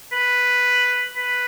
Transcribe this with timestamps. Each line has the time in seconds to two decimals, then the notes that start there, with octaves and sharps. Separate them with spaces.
0.12 B4
1.16 B4